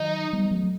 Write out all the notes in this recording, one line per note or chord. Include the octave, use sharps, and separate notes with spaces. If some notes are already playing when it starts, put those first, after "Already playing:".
Already playing: D#3 F#3 D#4
G3 B3
F#3 A3